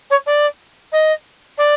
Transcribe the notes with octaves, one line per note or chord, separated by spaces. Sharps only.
C#5
D5
D#5
D5